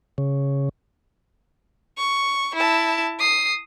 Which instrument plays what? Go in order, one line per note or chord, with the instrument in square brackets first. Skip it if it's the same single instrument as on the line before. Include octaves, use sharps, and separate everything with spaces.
[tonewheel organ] C#3
[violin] C#6
E4 A5
D#6 C7